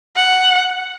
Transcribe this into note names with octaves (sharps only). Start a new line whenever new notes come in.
F#5